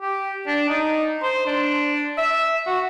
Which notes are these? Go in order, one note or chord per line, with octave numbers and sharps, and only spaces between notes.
G4
D4
D#4
C5
D4
E5
F#4